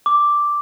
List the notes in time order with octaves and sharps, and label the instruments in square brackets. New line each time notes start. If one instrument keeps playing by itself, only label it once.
[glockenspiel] D6